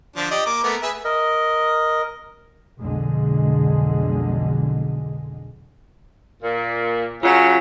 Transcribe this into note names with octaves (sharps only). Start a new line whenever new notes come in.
D3 F3 D4
G4 D5 D#5
A#3 A#5 D6
A3 B3 A#4
G#4 B4 E5
A#4 D#5
B1 F2 D3 G#3
A#2
C#3 F#3 F4 C#5 B6